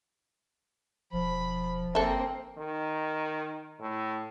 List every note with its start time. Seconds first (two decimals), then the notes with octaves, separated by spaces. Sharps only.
1.13 E1 F3 B5
1.95 F#1 A#3 C4 A4 E5
2.58 D#3
3.80 A2